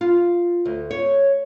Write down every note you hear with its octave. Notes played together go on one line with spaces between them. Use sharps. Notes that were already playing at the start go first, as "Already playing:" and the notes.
F4
D2
C#5